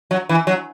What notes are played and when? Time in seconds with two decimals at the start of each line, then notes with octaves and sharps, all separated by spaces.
0.11 F#3
0.29 E3
0.47 F#3